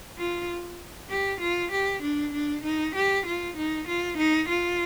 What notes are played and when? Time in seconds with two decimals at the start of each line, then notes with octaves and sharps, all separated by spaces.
0.18 F4
1.10 G4
1.41 F4
1.72 G4
2.03 D4
2.34 D4
2.64 D#4
2.96 G4
3.26 F4
3.57 D#4
3.88 F4
4.18 D#4
4.49 F4